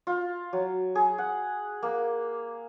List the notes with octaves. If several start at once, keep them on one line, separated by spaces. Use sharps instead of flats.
F4
F#3
G#4
F#5
A#3